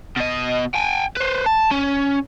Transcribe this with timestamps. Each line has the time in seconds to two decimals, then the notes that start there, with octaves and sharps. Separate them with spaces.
0.17 B2 D#5
0.75 G5 G#5
1.17 B4 C5
1.46 A5
1.71 C#4